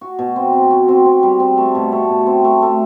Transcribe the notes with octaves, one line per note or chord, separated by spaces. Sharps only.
F#4
B2
C4
C4
F#4
C4
C4
G3
C4
A3
B2
A3
B2
C4
A3
A3